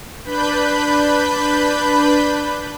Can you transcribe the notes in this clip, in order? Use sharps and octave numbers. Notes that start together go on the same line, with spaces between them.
D4 B4 B5 G6